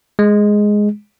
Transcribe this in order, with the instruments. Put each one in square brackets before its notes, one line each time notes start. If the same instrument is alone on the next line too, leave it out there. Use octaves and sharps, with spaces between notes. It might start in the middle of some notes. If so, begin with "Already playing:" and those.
[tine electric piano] G#3